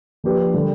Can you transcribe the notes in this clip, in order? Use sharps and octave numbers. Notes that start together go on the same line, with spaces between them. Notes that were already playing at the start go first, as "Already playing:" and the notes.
F3 A#3 D4 G4 B4
D3 G3